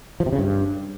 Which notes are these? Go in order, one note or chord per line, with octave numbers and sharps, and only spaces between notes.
F3
C3
C#3
G2